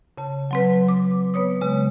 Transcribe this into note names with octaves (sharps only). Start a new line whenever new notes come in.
C#3 A5
F#3 C4 B4
D6
B3 B4 C#5 D#6
C#3 G#3 B4